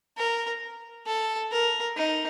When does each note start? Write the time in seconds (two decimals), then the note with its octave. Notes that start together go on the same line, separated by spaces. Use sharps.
0.17 A#4
1.06 A4
1.52 A#4
1.96 D#4